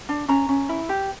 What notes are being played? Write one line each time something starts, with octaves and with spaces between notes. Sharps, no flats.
D4
C#4 A#5
C#4
E4
G4